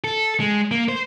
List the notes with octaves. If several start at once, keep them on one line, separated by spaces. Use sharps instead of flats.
A4
G#3
A#3
C5